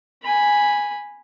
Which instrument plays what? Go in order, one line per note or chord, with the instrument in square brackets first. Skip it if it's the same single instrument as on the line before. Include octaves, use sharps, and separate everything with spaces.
[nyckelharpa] G#5 B5